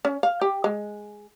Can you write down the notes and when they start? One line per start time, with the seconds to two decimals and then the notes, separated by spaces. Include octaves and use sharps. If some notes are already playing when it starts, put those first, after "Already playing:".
0.05 C#4
0.23 F5
0.41 G4
0.64 G#3